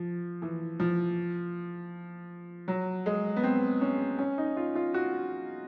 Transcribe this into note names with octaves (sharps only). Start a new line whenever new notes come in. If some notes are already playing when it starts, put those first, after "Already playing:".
Already playing: F3
E3
F3
F#3
G#3
B3
C4
C#4
C#4
D#4
F4
F4
F#4